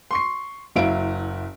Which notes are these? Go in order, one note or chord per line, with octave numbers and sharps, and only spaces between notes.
C6 C#6 C7
F#1 F#3 E4 F5 D7